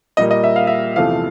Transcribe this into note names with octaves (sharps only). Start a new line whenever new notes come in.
A#2 G3 A#3 D#5
D#5
E5
F5
E5
E2 C3 F3 A3 F5